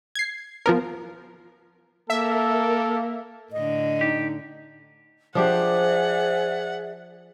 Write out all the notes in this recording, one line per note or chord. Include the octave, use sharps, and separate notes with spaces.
G#6 C7
F3 B3 A#4
A#3 A4 A#4 E5
A2 D3 D#5
D#4 G4
F3 D4 G4 G#4 C5 D5 E5 F#5